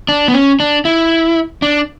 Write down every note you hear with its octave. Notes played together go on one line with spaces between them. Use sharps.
D4
B3
C#4
D4
E4
D4